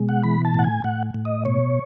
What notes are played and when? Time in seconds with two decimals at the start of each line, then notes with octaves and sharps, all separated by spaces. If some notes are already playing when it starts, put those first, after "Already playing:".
Already playing: B2 G#3
0.09 F#5
0.23 E3 B5
0.45 A5
0.54 A2 F#5
0.64 G#5
0.84 A2 F#5
1.14 A2
1.25 D#5
1.45 B2 C#5